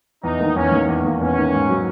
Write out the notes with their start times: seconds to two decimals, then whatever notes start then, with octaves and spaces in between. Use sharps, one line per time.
0.24 E2 D#4
0.40 D#3 A#3
0.56 E2 C#4
0.72 D#3 A#3
0.88 E2
1.04 D#3 A#3
1.21 E2 C#4
1.37 D#3 A#3
1.53 G#2
1.69 D#3 F#3